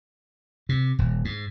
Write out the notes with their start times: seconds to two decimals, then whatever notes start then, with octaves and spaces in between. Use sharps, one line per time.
0.69 C3
0.99 D#1
1.25 G#2